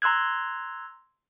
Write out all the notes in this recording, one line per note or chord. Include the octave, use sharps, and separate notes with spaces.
A#5 C6 E6 F#6 G#6